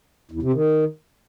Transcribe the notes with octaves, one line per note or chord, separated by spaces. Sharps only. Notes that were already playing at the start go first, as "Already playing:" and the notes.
E2
C3
D#3